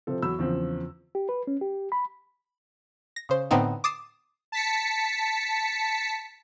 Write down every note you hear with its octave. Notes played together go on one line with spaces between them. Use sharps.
C3 F3 C4 A4
E2 F#3 B5 E6
E2 C#3 F3 C4
G4
B4
C#4
G4
B5
A#6
C#3 C5
A2 D3 B3 C4 D#4
D6 D#6 A6 C7 E7
A5 B6 C#7